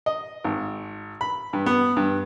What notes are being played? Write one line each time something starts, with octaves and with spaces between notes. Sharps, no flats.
D#5
G#1
B5
G2
B3
G2